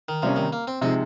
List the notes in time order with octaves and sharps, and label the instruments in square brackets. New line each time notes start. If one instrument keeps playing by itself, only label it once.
[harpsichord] D#3
[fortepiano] C3 G3 A#3 C#4 [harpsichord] F3
[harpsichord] D#3
A#3
C4
[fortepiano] C3 F3 G#3 D#4 [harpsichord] C4